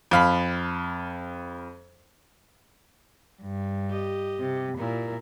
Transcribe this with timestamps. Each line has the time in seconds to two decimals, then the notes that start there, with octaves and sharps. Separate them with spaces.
0.11 F2 F5 B5
3.42 G2
3.89 G4 D#5
4.40 C3
4.78 A#2 E4 A#4